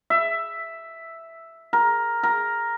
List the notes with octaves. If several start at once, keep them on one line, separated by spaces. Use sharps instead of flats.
E5
A#4
A#4